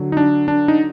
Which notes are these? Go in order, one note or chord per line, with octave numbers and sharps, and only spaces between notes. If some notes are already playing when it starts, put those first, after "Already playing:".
Already playing: D3 F#3
D#4
D4
D4
D#4